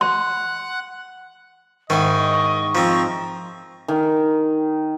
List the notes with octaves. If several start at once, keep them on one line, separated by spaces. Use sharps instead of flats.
F#5 C6 F#6
G#2 D#3 E4 D#5 G#5 C#6
F3 C4 A#5
D#3